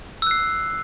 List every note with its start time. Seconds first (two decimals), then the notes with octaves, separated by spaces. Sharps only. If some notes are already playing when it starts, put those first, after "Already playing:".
0.22 E6
0.27 F#6
0.31 C7